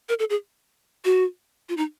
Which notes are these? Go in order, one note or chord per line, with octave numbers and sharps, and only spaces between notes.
A#4
A4
G#4
F#4
F4
D#4